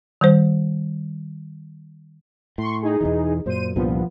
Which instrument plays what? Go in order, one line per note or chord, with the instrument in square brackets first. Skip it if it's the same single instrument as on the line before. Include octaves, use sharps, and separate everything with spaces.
[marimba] D#3 G3 C5
[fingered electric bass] A2 [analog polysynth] C6 C#6
[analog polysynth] D#4 G#4
[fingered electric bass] E2 B2 E3
[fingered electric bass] F#2 A#2 [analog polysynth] C5 D#7
[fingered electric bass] C2 G2 A#2 [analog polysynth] F3 B3